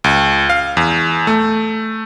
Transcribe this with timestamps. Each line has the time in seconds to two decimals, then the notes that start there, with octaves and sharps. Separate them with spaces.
0.04 C#2
0.50 F5
0.77 E2
1.27 A3